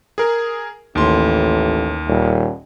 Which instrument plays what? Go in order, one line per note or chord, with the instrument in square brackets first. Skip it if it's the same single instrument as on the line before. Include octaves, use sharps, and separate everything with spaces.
[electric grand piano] G#4 A#4
[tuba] A1 [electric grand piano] D#2 C6
[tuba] D#1